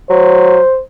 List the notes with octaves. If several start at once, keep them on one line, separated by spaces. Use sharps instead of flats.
F#3 C5